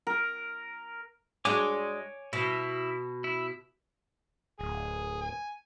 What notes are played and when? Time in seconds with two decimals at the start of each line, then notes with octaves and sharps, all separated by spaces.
0.07 A#4
1.45 G#3 D4 F#4 C#5 G#5 D6
2.33 B2 E4
3.24 E4
4.59 D1 G#4
5.21 G#5